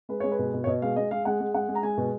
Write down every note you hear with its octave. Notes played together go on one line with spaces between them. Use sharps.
G#3 B4
G#3 C#5
B4
B2
B2
C#5
B2 D#5
G#3 F5
G#3 D#5
G#3 F5
G#3 F#5
G#3
G#3 F#5
G#3
A#5
G#3 G#5
B2